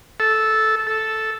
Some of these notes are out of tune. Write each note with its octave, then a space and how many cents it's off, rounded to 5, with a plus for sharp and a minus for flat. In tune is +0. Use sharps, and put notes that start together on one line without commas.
A4 -10
A4 -5